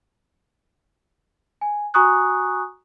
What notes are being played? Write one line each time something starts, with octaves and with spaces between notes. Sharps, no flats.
G#5
F#4 G#5 A#5 C#6 D#6 F#6